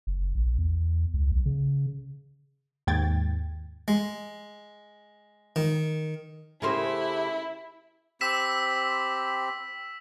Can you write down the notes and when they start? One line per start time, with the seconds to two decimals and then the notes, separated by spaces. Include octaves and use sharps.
0.07 F#1
0.35 A#1
0.58 E2
1.14 C#2
1.32 B1
1.46 C#3
2.87 D#2 G#2 G5 G#6 A6
3.88 G#3
5.56 D#3
6.62 C#3 A3 E4 G4 G#4 A#4 C5
8.21 C4 G4 B5 E6 B6 E7